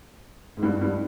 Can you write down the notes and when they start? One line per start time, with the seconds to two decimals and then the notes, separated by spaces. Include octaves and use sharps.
0.57 G#2
0.63 G2
0.81 G2